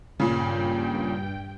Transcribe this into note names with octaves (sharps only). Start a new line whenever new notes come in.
G2 A#2 C#3 G5